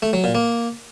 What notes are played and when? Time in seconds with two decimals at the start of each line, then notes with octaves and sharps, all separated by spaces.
0.02 A3
0.13 F#3
0.24 A#2
0.35 A#3